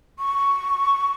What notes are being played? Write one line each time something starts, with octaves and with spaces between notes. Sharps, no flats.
C#6